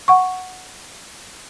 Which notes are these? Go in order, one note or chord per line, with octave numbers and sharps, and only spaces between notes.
F#5 C#6